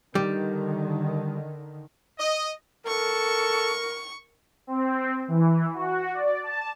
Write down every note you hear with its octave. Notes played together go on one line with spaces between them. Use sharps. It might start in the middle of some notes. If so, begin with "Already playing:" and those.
D3 D#3 G3
D#5
A4 A#4 C#6
C4
E3
F#4
D5
A5